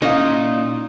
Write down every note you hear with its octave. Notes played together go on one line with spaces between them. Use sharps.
A#2 C#4 D#4 E4 F5